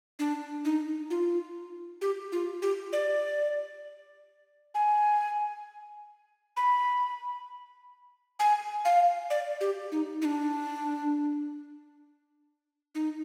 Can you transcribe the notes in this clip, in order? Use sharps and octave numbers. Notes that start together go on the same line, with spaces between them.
D4
D#4
F4
G4
F4
G4
D5
G#5
B5
G#5
F5
D5
G4
D#4
D#4
D4
D#4